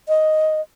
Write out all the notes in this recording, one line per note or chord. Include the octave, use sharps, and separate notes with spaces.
D#5